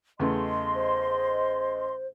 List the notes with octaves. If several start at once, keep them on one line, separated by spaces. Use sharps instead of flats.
E2 C#3 A3 D#5 C6
C5